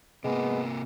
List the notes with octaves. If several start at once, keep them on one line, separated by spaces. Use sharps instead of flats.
C3 G#3 A#3 B3